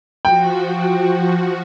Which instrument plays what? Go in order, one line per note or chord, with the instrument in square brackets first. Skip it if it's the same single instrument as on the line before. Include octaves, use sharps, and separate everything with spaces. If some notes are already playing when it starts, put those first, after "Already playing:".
[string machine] F3 F#4 [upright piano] G5